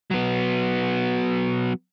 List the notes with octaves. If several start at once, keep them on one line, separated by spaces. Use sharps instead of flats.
F#3 B3